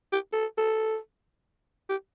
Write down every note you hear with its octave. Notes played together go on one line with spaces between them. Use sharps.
G4
A4
A4
G4